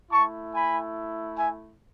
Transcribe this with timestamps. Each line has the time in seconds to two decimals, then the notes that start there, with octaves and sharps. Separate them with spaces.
0.10 A3 E4 A5 C#6
0.53 G#5 B5
1.35 E5 G#5